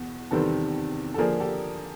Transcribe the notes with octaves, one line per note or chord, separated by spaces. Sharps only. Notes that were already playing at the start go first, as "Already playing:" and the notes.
Already playing: E2 B2
E2 C3 D#3 G3 C4 A4 B4
A4
D3 F3 A#3 D4 G#4 A#4
G4 A4